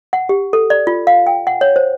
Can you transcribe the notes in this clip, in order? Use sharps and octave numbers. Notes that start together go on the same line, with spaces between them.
F#5
G4
A4
D5
F4
F5
G5
F#5
C#5
C5